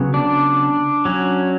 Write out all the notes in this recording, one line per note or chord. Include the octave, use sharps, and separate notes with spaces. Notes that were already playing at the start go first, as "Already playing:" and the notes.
Already playing: C#3 F#3 B3
D4
F#3 C#4